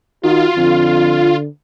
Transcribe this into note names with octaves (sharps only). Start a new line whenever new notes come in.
D#3 F4 F#4
F2 D3